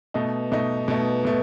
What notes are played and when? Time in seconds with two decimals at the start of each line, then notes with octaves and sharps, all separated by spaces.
0.14 B2 A3 D#4
0.52 B2 A3 D#4
0.88 B2 A3 D#4
1.25 B2 A3